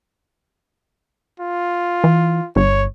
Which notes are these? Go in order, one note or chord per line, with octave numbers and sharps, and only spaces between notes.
F4
E3
G1 C#5